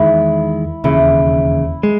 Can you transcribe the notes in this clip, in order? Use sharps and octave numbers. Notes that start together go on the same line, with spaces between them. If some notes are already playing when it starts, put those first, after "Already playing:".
Already playing: E2 D#3 G#3 E4
E1 D#2 C#3 E4
G#3